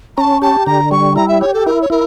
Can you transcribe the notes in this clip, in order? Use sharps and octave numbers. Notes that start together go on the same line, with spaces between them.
C#4 A5 A#5
G4 A5
D3 A#5
G3 C#6
E4 A#5
E5
G4 C#5
A4
E4 A#4
C#5
E4 A#4